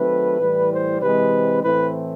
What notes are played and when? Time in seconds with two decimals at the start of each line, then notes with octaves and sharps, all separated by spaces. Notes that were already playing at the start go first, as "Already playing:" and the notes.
Already playing: D#3 F#3 A3 C4 B4
0.40 A2 E3 G3
0.71 C5
1.01 C3 E3 G#3 C4 B4
1.62 A2 E3 A3 C4 B4